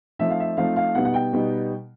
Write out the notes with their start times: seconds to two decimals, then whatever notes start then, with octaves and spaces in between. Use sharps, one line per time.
0.19 F3 A3 C4 D#4 E5
0.30 F5
0.40 E5
0.57 F3 A3 C4 D#4 F5
0.76 F5
0.94 B2 G3 B3 D#4 F#5
1.05 F#5
1.14 G5
1.33 B2 G3 B3 D#4